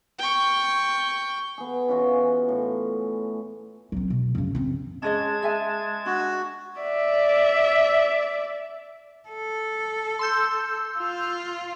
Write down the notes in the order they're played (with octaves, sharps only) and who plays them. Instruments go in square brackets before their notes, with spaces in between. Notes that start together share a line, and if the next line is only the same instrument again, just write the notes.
[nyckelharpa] G5 C#6
[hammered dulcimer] B3 G#4
E3 C#4 F4 F#4
A2
[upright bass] F#3 C4
B2
F#2 C#3
F#2 C4
[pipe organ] G#3 A5 G#6 [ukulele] C#4 G#4 D#5
[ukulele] G#4 E5 G#5
[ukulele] D4 [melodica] F#4
[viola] D5 E5
[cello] A4
[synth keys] C6 E6 G6
[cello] F4